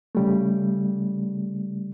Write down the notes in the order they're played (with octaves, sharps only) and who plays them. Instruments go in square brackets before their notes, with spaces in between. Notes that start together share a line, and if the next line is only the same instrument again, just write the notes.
[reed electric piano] C#3 G3 A3